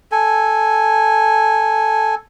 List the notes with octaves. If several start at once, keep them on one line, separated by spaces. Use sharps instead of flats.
A4 G#5